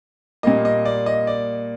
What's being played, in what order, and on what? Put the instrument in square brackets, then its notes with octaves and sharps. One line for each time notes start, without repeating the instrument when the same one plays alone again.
[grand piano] A#2 G3 A#3 D#5
D#5
D5
D#5
D5